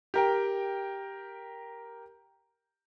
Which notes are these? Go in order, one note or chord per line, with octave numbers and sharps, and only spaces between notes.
G4 A#4 G5